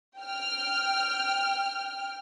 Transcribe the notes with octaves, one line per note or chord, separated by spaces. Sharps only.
G5 F6